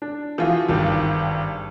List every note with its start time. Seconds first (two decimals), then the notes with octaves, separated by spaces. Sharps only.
0.02 D4
0.38 E3 F3 F4 F#4
0.69 G#1 G2 D#3